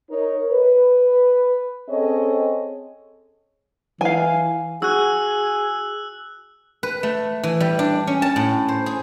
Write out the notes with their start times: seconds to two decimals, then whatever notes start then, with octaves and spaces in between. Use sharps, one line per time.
0.11 D#4 A#4 C#5
0.50 B4
1.89 C4 C#4 G#4 A4 C#5 D#5
4.01 E3 F5 G#5
4.82 F#4 G#4 E6 F#6
6.83 B4
7.03 A3
7.43 E3
7.60 G3
7.79 D4
8.07 C#4
8.22 A5
8.36 A2
8.68 C5
8.86 G#4